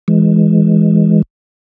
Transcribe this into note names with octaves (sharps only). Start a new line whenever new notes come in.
E3 G#3